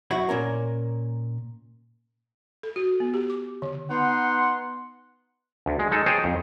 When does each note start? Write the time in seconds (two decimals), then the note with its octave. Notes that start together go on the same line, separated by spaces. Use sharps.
0.11 F#2 E4 F#4 C#5 B5
0.29 A#2 A#3 C#4 A#4
2.63 A4
2.76 F#4
3.00 B3
3.14 G4
3.30 D6
3.62 D3
3.91 B3 D#4 F#5 C6
5.66 D2
5.79 G#3
5.92 G#3 D#4 A4
6.06 G#4 C5 C#5 D#5 G5 A5
6.24 F2